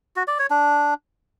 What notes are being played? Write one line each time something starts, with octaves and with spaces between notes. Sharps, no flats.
F#4
D5
C#5
D4